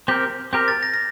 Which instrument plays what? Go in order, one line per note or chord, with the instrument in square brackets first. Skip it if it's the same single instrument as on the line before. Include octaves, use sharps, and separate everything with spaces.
[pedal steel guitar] C4 G4 A#4 [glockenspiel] G6
[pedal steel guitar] C4 G4 A#4 [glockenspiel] G6
[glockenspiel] A6
A#6
A#6